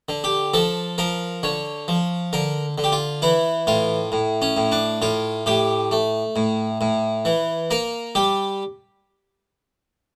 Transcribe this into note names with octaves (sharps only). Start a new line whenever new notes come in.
D3
G4
F3 A4
F3 A#4
D3 C#5
F3
D3 A#4
D3
G4
F4
E3 E4
A2 F4
A2
C#4
A2
D4
A2 F4
A2 G4
A3
A2
A2
E3
A#3 A#4
G3 G4